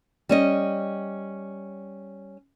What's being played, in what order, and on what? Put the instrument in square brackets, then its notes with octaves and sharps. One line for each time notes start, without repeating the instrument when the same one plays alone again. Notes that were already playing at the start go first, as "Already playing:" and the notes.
[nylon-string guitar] G3 C#4 D#5